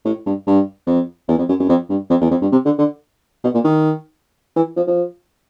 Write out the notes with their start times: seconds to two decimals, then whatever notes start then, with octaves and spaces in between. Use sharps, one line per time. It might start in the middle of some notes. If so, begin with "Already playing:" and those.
0.05 A2
0.26 G2
0.47 G2
0.87 F2
1.28 E2
1.38 F2
1.49 F#2
1.60 F#2
1.69 F2
1.89 G2
2.10 F2
2.21 E2
2.31 F2
2.41 G2
2.52 C3
2.65 D3
2.78 D3
3.44 B2
3.54 A#2
3.64 D#3
4.56 E3
4.76 F3
4.87 F3